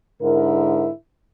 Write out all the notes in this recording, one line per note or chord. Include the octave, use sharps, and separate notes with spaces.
G#2 D3 E4 A#4